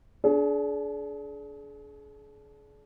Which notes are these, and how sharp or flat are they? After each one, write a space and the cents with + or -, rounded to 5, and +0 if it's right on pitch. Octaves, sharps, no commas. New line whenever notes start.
D4 -20 G#4 +35